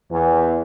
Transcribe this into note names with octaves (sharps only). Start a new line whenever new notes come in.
E2